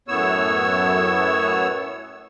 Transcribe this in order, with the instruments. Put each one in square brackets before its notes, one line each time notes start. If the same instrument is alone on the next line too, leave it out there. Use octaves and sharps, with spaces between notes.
[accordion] F#2 A2 B3 C#5 E6